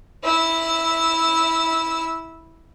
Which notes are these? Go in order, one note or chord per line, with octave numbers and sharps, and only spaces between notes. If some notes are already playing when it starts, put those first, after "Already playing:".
E4 E6